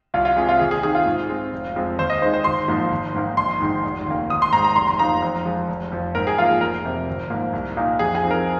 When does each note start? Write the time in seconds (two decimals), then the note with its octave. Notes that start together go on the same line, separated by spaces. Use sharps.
0.14 C2 F4
0.25 F4
0.36 C3 G#3 G#4
0.49 F4
0.59 D#2 G#4
0.71 G#4
0.83 D#3 C4 G#4
0.95 F4
1.06 G#2
1.29 G#3 C4
1.52 F1
1.76 F2 F3 G#3 C4
1.98 D#2 C5
2.10 D#5
2.22 D#3 G#3 C5
2.33 C5
2.44 G#1 C6
2.68 G#2 F3 A#3 D#4
2.91 G#1
3.14 G#2 D#3 A#3 D#4
3.37 A#1 C6
3.60 G#2 D#3 G#3 D#4
3.84 F1
4.06 D#2 D#3 A#3
4.29 G#1 D#6
4.42 C6
4.52 G#2 A#5
4.57 G#3
4.64 A#5
4.76 F1 C6
4.88 C6
4.99 F2 F3 A#3 D#4 A#5
5.22 F2
5.45 F3 G#3
5.68 F1
5.92 F2 F3
6.15 G#2 A#4
6.27 G#4
6.38 F3 F4
6.42 A#3
6.50 G#4
6.61 F1 A#4
6.85 F2 C3
7.07 G#1
7.30 G#2 F3 A#3
7.53 C2
7.77 A#2 A#3 D#4
7.99 F2 G#4
8.15 G#4
8.23 F3 C4 D#4
8.31 A#4